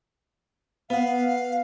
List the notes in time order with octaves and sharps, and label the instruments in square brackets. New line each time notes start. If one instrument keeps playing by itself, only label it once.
[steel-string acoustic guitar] B3 F#5 [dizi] F5